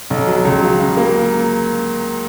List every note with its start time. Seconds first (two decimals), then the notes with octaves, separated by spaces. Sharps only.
0.10 B1
0.27 F#3
0.45 C#2
0.62 F#3
0.79 C#3
0.97 A#3